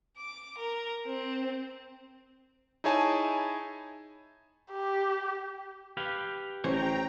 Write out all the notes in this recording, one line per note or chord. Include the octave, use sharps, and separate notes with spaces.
D6
A#4
C4
D#4 E4 G#4 C#5 G#5 A5
G4
G4 B4 F5
A1 E3 C5 C#5 G5 A#5